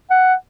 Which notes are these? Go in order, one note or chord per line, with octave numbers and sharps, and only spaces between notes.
F#5